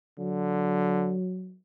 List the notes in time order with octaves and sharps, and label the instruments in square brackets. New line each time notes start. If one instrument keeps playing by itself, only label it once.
[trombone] D3 [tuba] F#3